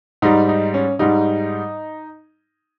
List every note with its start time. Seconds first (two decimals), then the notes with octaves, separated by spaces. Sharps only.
0.22 G#2 G3 D#4
0.48 D#4
0.74 C#4
0.99 G#2 G3 D#4